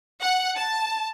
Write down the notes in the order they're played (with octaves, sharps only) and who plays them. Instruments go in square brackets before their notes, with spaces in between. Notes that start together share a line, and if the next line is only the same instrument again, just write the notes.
[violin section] F#5
A5